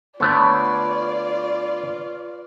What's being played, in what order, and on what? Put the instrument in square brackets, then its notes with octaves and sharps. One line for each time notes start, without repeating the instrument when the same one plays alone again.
[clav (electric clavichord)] D3 A3 B3 [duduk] F4 [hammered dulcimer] B4 C#5 [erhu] D5